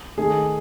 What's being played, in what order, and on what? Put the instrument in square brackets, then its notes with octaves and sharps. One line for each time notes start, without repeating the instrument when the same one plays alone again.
[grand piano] D#3 A3 G#4